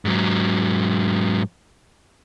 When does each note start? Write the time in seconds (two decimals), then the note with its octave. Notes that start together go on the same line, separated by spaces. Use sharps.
0.05 G#2 F#3